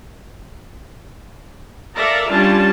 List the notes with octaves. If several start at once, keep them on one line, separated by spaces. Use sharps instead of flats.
A4 A#4 D5 E5 F5 A#5
G3 C#4 D4 F4 A5